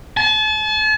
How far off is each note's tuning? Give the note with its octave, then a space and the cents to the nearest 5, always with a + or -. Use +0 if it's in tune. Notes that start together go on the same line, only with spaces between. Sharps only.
A5 -40